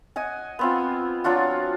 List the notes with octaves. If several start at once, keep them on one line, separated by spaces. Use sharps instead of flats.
D#5 F#5 G#5
B3 C4 F4
F#3 D4 F4 F#4